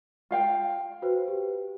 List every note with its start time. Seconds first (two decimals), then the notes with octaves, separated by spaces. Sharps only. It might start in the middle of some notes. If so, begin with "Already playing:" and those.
0.31 F4 F5 G5
1.02 F#4 B4 C5
1.28 G4